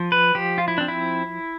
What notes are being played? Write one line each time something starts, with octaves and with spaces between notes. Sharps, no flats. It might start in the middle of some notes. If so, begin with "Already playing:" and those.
Already playing: F3
B4
F3 G4
F4
E4
C4 D4
E4